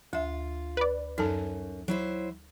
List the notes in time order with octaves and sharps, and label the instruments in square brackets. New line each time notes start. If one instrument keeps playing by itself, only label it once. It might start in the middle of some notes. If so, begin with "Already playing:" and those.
[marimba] D2 E5 [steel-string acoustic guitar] F4
[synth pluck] B4 D5
[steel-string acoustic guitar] F#2 [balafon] D#4 A4 A5
[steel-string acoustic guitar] F#3 E4 C5